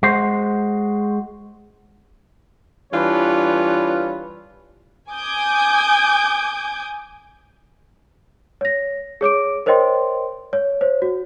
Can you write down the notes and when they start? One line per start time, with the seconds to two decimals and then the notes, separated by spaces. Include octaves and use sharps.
0.03 G#3 F#4 C5
2.92 E3 G3 D4 F4 B4 C#5
5.10 G#5 D6 D#6 G6 G#6
8.61 C#5 A#6
9.21 G#4 C#5 D6 D7
9.66 A#4 C5 C#5 D#5 G5 C6
10.53 C#5
10.81 C5 C#5
11.02 F#4